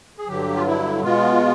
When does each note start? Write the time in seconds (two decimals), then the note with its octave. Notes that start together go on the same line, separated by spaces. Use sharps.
0.18 G#4
0.27 G2 D3 F#3 G4
0.55 F4
0.66 E4
1.03 B2 G#3 B3 F4